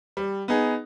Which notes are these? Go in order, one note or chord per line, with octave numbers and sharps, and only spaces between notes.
G3
B3 D#4 G#4